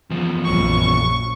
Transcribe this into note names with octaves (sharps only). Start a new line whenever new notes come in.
E2 F3
A#1 F#2 C#6